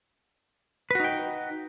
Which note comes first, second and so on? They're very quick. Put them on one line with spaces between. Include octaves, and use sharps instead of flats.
B4 F#4 D#4 G5